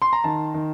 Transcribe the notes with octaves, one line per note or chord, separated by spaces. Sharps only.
C6
A#5
D#3 A5
D#3